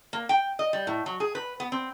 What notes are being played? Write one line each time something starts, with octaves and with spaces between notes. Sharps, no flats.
A#3
G5
D#5
G3
A2
F#3
G#4
B4
B3
C4